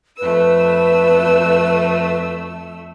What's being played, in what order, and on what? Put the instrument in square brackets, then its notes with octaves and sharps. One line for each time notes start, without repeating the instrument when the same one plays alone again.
[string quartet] F2 A3 E6 [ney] B4